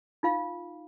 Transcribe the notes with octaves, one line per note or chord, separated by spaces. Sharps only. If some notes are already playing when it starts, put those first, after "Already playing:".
D#4 F4 F5